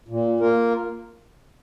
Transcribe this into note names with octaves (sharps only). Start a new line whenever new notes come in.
A#2
A#3 F4 A#4